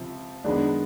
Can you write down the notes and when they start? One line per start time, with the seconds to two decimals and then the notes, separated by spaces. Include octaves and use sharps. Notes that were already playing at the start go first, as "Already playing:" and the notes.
Already playing: C#2 C3 F3
0.44 F#2 D#3 G#3 B3 D4